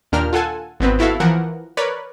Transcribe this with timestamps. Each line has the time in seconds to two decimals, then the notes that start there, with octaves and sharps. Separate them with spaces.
0.12 D#2 A#2 D4 A#4 G5 F6
0.33 F4 A4 F#5 G#5 A5
0.80 G#1 B3 C4 B4
0.99 B3 E4 F#4 A4 E5 F5
1.20 E3 F3 A#4 F#5
1.77 A#4 B4 C#5 D5 B5